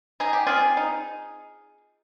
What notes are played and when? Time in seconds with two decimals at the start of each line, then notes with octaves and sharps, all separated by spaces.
0.20 D#4 G#4
0.33 G4
0.47 C4 F4 G#4
0.77 D#4